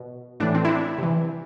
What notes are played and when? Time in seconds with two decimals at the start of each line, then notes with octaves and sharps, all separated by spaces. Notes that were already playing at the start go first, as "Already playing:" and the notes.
Already playing: B2
0.40 A2 E3 D4
0.55 C4
0.65 E4
0.69 D4
0.98 C3 E3